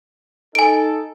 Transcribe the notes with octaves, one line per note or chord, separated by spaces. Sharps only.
D#4 A4 G#5 D7